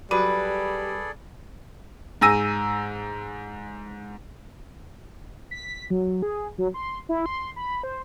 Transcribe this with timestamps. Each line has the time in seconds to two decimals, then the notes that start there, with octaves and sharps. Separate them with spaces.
0.11 F#3 G3 F#4 G#4 A4 B4 D5
2.21 G#2 G#5 E6 A#6 D#7
5.51 B6
5.90 F#3
6.22 G#4
6.58 F#3
6.74 C6
7.09 E4
7.26 C6
7.56 B5
7.83 C5